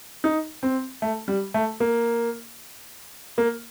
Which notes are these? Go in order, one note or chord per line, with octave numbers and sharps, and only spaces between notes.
D#4
C4
A3
G3
A3
A#3
A#3